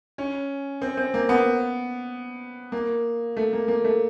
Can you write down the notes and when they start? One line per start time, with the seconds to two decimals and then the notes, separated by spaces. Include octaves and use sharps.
0.18 C#4
0.82 C4
0.97 C4
1.14 A#3
1.29 B3
2.72 A#3
3.37 A3
3.53 A#3
3.68 A#3
3.85 A3